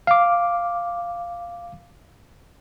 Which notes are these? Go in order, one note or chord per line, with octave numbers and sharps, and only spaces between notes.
F5 D6